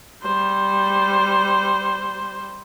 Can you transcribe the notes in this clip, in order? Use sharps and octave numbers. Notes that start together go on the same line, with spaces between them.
G3 C5